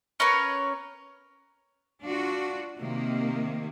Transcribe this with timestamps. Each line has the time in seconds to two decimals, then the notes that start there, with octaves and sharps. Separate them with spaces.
0.20 C#4 A#4 B4 C#5
2.04 D4 F4 F#4
2.80 C3 D#3 A#3